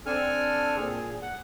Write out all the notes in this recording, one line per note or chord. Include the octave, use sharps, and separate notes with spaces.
C4 D4 A4 G#5 F6
A#2 G#4
F#5